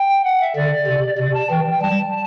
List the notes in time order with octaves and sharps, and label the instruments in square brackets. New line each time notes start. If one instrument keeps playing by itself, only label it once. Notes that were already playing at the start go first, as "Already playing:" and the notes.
Already playing: [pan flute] G5
F#5
E5
[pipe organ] D3 [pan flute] D5
[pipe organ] C3
[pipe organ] C3 [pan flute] D5
[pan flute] A5
[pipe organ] E3 [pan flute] G5
[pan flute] G5
[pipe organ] G3 [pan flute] A5